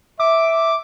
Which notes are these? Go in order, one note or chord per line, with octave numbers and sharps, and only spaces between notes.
E5 D6